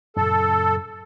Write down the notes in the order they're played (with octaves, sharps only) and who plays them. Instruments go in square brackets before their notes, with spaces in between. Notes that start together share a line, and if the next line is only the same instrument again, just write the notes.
[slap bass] F#2 A#2 C#3 [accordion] A4